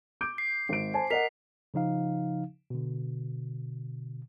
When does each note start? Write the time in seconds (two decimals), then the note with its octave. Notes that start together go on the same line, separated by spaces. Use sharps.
0.21 D6 G6 D7
0.38 C7
0.69 G#1 D7
0.94 C5 G#5 A5
1.10 A#4 D#5 F#5 B6 F7
1.74 C#3 F3 D#4 F5
2.70 B2 D3